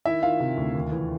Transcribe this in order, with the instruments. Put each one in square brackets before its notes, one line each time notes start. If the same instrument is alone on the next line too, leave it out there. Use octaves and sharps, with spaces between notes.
[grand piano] D#3 E4 E5
D#3 F4 F5
C3
D2
D#2
E3